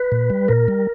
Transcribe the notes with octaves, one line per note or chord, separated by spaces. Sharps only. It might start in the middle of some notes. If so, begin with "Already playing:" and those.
Already playing: B4
A#2
G3
A#2 A#4
G3